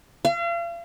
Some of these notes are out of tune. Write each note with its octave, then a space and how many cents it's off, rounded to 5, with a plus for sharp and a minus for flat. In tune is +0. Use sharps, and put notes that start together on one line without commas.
F5 -40